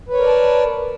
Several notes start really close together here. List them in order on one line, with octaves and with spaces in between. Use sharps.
B4 C#5 A#4 D5 A5